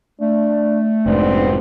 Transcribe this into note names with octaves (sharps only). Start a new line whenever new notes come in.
A3 D4
F1 G#2 B2 C4 D4